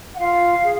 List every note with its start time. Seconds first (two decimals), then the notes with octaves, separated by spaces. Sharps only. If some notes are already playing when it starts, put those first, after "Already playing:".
0.14 F#5
0.19 F4 F5
0.63 G#4